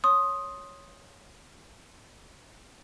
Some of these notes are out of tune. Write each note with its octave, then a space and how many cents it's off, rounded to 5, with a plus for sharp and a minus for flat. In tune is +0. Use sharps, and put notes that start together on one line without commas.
C#5 +0 C6 +20 D#6 +0